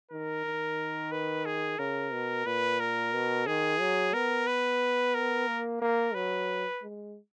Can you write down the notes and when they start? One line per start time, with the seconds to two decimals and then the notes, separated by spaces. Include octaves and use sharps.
0.11 D#3 A#4
0.45 D#3
1.12 B4
1.46 G#4
1.79 C#3 A#4
2.12 B2
2.46 A#2 B4
2.80 A#4
3.13 B2
3.47 D#3 G#4
3.81 F#3
4.14 B3 A#4
4.47 B4
5.14 A#4
5.48 A#3
5.81 A#3 A#4
6.15 F#3 B4
6.82 G#3